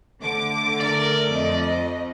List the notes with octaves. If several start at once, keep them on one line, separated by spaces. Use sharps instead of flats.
D3 A3 D6
A#4 D5
F2 D#5